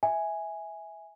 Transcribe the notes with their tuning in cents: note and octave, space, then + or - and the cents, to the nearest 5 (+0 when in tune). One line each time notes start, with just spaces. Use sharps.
E5 -15 G#5 +0